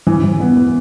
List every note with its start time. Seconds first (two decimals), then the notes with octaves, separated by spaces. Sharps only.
0.07 E3
0.24 E3
0.40 B3
0.56 B3